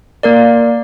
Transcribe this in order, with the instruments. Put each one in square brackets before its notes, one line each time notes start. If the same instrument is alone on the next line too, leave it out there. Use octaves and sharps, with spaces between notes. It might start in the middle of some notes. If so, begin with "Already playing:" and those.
[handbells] A#3 A#4 D5